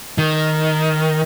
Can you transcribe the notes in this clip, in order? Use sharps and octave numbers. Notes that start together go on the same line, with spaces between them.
D#3